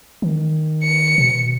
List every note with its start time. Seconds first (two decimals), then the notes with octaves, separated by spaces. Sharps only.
0.22 D#3
0.83 C#7
1.18 B2